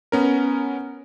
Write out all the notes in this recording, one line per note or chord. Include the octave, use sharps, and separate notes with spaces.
B3 C#4 A#4